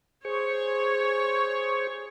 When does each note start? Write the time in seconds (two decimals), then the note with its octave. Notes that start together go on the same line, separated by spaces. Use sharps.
0.25 G#4 C5 C#5 C#6